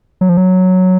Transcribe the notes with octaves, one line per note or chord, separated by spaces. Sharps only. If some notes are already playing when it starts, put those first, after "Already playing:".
F#3
F3
F#3